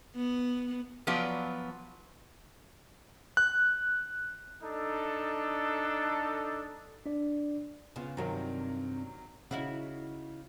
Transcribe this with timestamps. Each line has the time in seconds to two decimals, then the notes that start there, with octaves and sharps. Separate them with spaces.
0.16 B3
1.07 F3 F#3 B3 F4 D5
3.37 F#6
4.63 D4 D#4 A4
7.06 D4 D5
7.96 C#3 B3 F4
8.17 G2 C3 D#3 F#3 A#4
9.51 C#3 D#4 E4 F#4